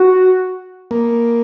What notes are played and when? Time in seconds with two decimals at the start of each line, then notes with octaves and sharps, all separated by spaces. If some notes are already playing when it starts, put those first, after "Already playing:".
Already playing: F#4
0.91 A#3